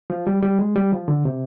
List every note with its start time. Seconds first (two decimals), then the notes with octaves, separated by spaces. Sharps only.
0.10 F3
0.27 G3
0.43 G3
0.59 G#3
0.76 G3
0.92 F3
1.08 D3
1.25 C3